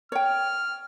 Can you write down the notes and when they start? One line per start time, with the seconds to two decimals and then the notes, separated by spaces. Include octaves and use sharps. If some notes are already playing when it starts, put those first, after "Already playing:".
0.12 C#5 G5 F6